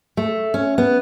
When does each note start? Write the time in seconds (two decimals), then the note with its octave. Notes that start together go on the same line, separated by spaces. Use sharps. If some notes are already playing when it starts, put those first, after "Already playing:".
0.17 A3
0.54 C#4
0.78 B3